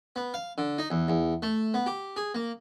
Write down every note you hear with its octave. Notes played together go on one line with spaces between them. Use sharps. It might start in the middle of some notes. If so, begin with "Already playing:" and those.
B3
F5
D3
D#4
E2
E2
A3
B3
G4
G#4
A#3